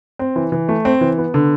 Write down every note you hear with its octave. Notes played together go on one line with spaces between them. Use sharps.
C4
E3
E3
A3
C4
E3
B3
D3